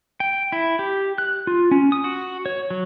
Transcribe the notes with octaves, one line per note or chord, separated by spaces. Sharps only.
G5
E4
G4
F#6
F4
C#4
D#6
F#4
C#5
F#3